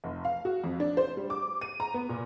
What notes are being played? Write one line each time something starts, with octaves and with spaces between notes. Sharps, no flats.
F1
F5
F#4
F2
D4
C5
G3
D6
D#7
A#5
B3
A#2